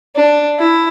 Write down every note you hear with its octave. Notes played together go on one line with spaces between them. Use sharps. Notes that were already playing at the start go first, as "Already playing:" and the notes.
D4
E4